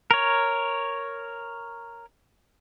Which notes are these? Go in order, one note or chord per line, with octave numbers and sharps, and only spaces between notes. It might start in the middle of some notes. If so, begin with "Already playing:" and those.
A#4 C#5